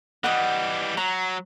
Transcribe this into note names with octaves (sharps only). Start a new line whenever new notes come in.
E3 G3 D#5 F#5
F#3 A#5